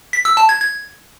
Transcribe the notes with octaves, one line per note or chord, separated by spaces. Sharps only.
B6
E6
A5
G#6
G#6